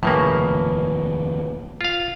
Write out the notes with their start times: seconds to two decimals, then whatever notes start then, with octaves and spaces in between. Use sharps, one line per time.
0.03 F1 D#2 A2 C#3 F3 A#3 B4
1.81 F4 F5